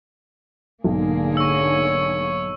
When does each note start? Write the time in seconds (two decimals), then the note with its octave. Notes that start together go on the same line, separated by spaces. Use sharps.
0.84 B1 G#2 D3 A#3 G#4
1.37 C#5 C#6 E6